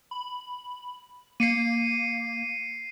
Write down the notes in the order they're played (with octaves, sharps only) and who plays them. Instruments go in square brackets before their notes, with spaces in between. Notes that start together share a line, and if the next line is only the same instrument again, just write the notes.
[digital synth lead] B5
[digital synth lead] A#3 [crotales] C7 C#7 D#7